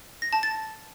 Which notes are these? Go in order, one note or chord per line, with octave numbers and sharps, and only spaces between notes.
A#6
A5
A6